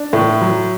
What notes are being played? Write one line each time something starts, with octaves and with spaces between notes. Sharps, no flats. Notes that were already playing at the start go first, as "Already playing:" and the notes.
Already playing: D4
A2
F#3